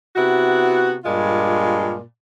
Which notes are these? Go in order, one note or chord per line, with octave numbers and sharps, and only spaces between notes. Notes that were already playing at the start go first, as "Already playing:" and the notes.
C3 B3 E4 F#4
G2 A#2 G#3 F4